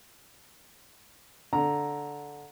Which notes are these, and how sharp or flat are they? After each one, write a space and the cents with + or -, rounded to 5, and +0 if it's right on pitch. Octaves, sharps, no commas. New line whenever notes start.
D3 -10 A#5 +0